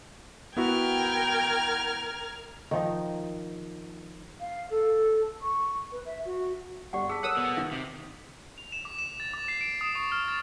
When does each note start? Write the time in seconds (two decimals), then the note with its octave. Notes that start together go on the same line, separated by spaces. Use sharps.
0.57 B3 E4 F#4 A#4 G5 F6 G#6
2.71 D#3 F3 D#4
4.40 F5
4.70 A4
5.42 C#6
5.92 B4
6.05 E5
6.25 F#4
6.93 G1 G4 D5 F#5
7.09 G#4 A5 E6 B6
7.23 A4 A#4 C#5 F#5 D#6 E6
7.37 B2 B3
7.57 D#3 F5
7.72 C3
8.58 F7
8.72 E7
8.85 D6
8.99 E7
9.20 A6
9.33 D6
9.48 C7
9.61 D7
9.81 D#6
9.95 C#6
10.12 F6
10.28 A6